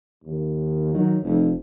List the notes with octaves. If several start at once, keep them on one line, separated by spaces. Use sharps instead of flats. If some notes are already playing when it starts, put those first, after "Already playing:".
D#2
D#3 F#3
F1 F2